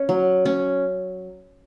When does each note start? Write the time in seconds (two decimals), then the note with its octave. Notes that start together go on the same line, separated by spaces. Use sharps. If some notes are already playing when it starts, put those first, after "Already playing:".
Already playing: C#4
0.09 F#3
0.45 C#4